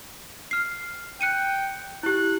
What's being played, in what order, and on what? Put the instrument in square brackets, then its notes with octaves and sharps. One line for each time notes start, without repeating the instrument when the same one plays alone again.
[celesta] F6 C7
[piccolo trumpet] G5 [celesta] F#6 C#7 D#7
[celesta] E4 G4 [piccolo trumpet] F#6